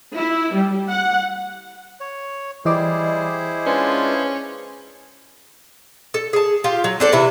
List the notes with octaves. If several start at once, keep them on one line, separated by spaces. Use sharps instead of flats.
E4
G3
F#5
C#5
E3 G3 E4 G#4 C5 D#5 D6
G#3 C#4 D4 F4 B4
A4
G#4 A5
F4 G4
F#3
C4 D4 A4
C3 E3 E4